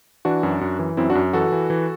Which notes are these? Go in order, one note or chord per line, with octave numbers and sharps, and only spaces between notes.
E3 D4 F#4
F#2
F#2
E3
F#2 C4 E4
D4 F#4
F#2
E3 F#4 A4
E3
E3